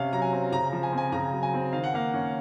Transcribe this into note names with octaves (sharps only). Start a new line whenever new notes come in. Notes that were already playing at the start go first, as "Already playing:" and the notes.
Already playing: C3 C#4 F5
F#3 A#5
G#5
C4
C#3 A#5
A#5
F3
G#5
C4
G#5
C#3 A#5
F#3
G#5
C4
D#3 F5
F#5
A#3 F5
C#4